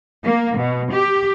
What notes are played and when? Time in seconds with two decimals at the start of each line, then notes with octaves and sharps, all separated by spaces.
0.24 A#3
0.58 B2
0.92 G4